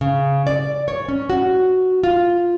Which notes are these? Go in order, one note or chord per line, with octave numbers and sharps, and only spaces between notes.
C#3
D5
C#5
C#4
F#4
F4